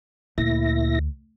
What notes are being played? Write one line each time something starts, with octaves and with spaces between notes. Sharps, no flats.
D2 A#2 E4 A#6